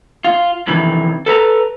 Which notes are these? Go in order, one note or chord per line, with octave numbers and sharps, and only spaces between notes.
F4
F2 C3 D#3 E3
A4 B4 A5 A#5